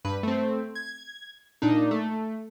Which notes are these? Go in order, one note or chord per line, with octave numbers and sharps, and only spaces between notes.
G2 B4
A3 C4
G#6
A#2 D4 D#4
A3